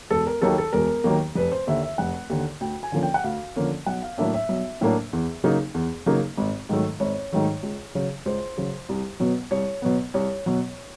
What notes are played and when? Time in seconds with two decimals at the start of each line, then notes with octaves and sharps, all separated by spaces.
0.10 E1 A4
0.27 A#4
0.42 D#2 D#3 F#3 A#3 A4
0.58 A4
0.73 E1 A#4
1.04 D#2 D#3 F#3 A#3
1.35 F1 B4
1.52 C5
1.67 D#2 D3 E5
1.82 E5
1.98 F1 F#5
2.30 D#2 D3
2.61 D2 G5
2.83 G#5
2.92 D3 F3 A#3 C#4
3.03 G5
3.14 F#5
3.24 D2 F5
3.56 D3 F3 A#3 C#4
3.86 B1 F#5
4.02 F5
4.18 A2 F#3 A#3 D4 E5
4.34 E5
4.49 B1
4.81 A2 F#3 A#3 D4
5.13 E2
5.44 C#3 F#3 A#3 D#4
5.74 E2
6.06 C#3 F#3 A#3 D#4
6.37 G#1
6.69 G#2 D#3 F#3 A3
7.00 G#1 C#5
7.32 G#2 D#3 F#3 A3
7.63 C#2
7.95 C#3 F#3
8.26 C#2 C5
8.57 C#3 F#3
8.89 C2
9.20 B2 F#3 B3
9.51 C2 C#5
9.82 B2 F#3 B3
10.14 C2 C#5
10.46 B2 F#3